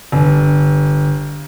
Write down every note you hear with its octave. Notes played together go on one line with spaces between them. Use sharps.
G1